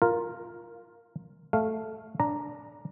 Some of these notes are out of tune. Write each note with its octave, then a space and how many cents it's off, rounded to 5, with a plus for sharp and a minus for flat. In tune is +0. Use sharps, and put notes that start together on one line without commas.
F4 +0 A#4 +0
A3 +0 F5 +0
D4 +0 A#5 +0